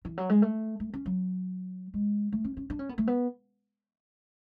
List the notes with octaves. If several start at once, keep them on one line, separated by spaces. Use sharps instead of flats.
E3
F#3
G#3
A3
A3
C#4
F#3
G#3
A3
C#4
C#4
D4
C#4
B3
A3
B3